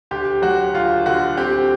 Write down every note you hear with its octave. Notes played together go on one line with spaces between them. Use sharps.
D2 G4
F#3 F#4
D2 F4
D3 F#4
C4 G4